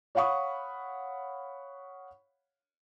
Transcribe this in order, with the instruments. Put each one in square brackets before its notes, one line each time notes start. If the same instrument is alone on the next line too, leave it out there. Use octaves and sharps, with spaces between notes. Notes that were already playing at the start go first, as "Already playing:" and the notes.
[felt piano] C#5 F5 F#5 B5 C#6 D#6